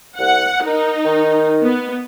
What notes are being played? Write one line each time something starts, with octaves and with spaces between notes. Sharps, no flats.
C2 F#5
D#4 A#4
D#3
B3